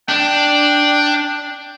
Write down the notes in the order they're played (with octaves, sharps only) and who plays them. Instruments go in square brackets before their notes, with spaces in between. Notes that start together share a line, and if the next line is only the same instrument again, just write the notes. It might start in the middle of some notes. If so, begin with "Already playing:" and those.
[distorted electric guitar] D4 [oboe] G5